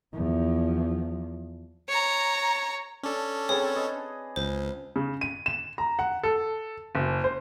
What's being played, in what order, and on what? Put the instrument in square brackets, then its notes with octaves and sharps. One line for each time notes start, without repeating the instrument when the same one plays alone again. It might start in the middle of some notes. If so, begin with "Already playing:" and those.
[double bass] E2 F3
[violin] C#5 A#5
[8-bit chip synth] C#4 A4 [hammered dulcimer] D4
[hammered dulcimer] C4 B4 [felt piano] G#4 [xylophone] C#5
[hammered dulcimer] B4 D#5
[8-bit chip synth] C#2 [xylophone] C5
[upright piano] C#3
D#7
E7
A#5
F#5
A4
F#1
C5